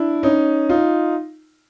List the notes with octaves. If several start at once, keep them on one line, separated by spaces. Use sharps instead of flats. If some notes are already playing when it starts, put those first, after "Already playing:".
Already playing: D4 E4
C#4 D#4
D#4 F4